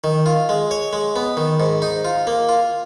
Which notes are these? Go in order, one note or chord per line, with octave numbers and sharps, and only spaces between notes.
D#3
F4
G#3
C#5
G#3
B3
D#3
G#2
D#4
F4
A#3
F4